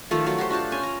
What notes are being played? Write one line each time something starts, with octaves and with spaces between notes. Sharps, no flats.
D#3 F3 A3 F4
F#3 A3 F4
F#4 G4 C5
D4 F4 C5 A5
C#4 G#5
A#5